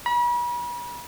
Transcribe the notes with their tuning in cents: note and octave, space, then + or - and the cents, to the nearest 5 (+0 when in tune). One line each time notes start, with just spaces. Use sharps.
B5 -40